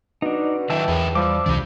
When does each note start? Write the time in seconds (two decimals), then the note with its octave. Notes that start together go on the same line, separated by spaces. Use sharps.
0.22 B2 D4 D#4
0.70 D#3 E3 F#3 D4 G5 A5 E6
0.88 E2 E4 G#4 A#4
1.15 F3 G3 D6 E6
1.46 C#2 C3 E3 D4 G4